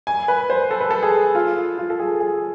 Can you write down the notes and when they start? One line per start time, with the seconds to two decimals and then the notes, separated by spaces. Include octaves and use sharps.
0.07 G#5
0.28 B4
0.50 C5
0.71 A4
0.81 B4
0.90 A4
1.03 G#4
1.35 F4
1.78 F4
1.90 A4
1.99 G#4
2.20 G#4